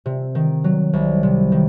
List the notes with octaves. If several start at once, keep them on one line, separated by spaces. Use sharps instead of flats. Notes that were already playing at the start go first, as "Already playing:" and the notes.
C3
D#3
F#3
C2
C3
D#3